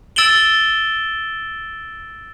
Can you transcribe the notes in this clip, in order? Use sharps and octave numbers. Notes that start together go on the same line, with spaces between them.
E6 A6 D7 E7 F#7 G7